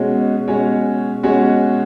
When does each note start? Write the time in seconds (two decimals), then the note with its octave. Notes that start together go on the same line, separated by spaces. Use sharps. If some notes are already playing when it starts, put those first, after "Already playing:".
Already playing: B2 G#3 C#4 F#4 C#5
0.48 B2 G#3 C#4 F#4 C#5
1.23 B2 G#3 C#4 F#4 C#5